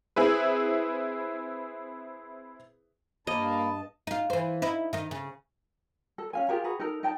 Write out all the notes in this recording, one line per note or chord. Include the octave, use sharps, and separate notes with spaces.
C4 E4 G#4 B4
G2 A#3 D#5 A5 B5
D#4 F4
E3 C5
D#4 E4
D#3 D#4
C#3
A4
C#4 F5 G#5
F4 G4 G#4 A#4
F#4 G#4 B4 A#5
D#4 A4 A#4
D#4 G5 A5